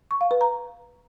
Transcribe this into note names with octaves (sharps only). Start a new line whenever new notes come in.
C#6
F5
B4
A#5